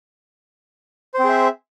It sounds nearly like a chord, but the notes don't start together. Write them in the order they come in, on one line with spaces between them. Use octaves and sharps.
C5 C4 G#4 E5